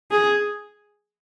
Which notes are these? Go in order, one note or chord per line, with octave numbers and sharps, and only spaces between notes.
G#4